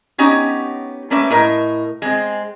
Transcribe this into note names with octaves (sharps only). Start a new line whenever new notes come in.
B3 C#4 D#4 G4
G3 A3 A#3 C#4 B4 E5
A2 A#4 D#5
G#3 C4